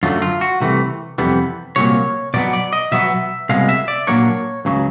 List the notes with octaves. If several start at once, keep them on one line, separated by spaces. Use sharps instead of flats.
F#2 D3 F#3 A3 F4
F4
F#4
C2 C3 E3 A3
F2 C3 E3 G3 B3
C2 A#2 F#3 A#3 C#5
B2 F#3 B3 D5
D5
D#5
B2 F#3 B3 E5
C2 B2 G#3 F5
E5
D5
A#2 F#3 A#3 D4 C#5
C#2 C#3 F#3